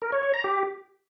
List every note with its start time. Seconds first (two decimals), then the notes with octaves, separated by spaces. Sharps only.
0.02 A#4
0.12 C#5
0.23 C#5
0.34 A#5
0.44 G4